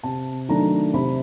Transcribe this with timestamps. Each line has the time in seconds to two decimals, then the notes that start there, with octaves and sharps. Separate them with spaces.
0.03 C3 A5
0.49 D#3 F#3 A3 D4 A#5
0.94 C3 B5